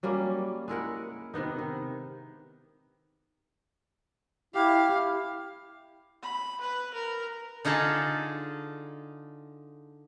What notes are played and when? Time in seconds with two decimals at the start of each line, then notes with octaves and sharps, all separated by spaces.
0.03 F#3 G3 A#3 C#4
0.68 G#3 E4 A#4 F#5
1.34 C3 D#3 B3 D#4
1.59 D#3
4.55 E4 G4 F5
6.23 B5
6.61 B4
6.94 A#4
7.65 D3 D#4 F4 G#4 A4